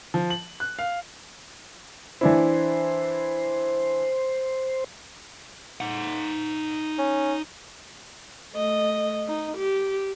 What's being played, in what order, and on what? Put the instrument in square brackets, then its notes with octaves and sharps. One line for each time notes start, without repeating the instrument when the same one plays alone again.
[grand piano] F3
F#7
F#6
F5
[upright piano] E3 D4 E4 [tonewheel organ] C5
[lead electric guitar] D#4 F#5
[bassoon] C#4
[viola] A3 D#5
D#4
G4